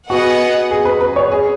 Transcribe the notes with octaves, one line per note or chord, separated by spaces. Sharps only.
B3 F#4 G#4 D#5 F#5
G#4
B4
B4
C#5
G#4